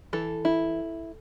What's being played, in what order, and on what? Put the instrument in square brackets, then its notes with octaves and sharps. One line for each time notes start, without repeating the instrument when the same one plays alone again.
[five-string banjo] E3 A4
E4